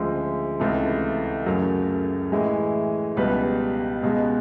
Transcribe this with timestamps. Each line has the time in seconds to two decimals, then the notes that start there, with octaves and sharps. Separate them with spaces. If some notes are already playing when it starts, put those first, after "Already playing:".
Already playing: D2 C#3 F3 G#3
0.60 C#2 C3 E3 A3 A4
1.46 F#2 C#3 F#3 A3 A#4
2.32 A2 E3 G#3
3.17 C#2 B2 G3 B4
4.03 C#2 B2 G#3